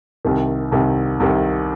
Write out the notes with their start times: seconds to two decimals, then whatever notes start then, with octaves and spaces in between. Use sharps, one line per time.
0.25 C2 C3 D#3
0.72 C2 C3 D#3
1.20 C2 C3 D#3